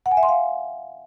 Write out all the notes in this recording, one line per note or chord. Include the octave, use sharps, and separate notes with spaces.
F#5
G#5
E5
C6
F5